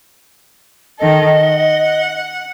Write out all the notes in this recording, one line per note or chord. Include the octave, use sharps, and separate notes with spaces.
D#3 A4 D#5
F#5